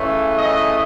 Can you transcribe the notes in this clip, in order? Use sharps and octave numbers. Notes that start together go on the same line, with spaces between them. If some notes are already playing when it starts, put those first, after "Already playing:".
Already playing: C#3 E3 A3
D#5